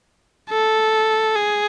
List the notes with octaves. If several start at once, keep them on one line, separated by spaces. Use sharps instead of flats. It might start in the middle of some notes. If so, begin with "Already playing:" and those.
A4
G#4